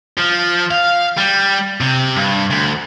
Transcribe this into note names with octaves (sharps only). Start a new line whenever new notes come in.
F3
F5
G3
C3
G2
D2